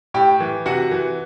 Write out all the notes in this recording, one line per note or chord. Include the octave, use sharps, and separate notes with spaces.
A2 G4 G5
E3
C3 F#4 F#5
E3